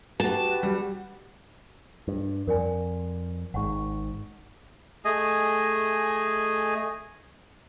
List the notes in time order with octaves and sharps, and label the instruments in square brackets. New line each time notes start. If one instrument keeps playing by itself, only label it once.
[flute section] F#4 G4 B4 [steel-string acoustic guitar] A5
[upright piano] G3
[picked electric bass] G2
[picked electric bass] F2 [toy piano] A#4 D5 G#5
[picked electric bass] G#1 G#2 [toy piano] F#5 C#6
[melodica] A3 G#4 D#5 G#5